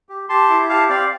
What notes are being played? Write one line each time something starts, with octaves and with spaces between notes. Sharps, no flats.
G4
G4 A5 C6
E4
G4 F5 A5
C4 D5 F5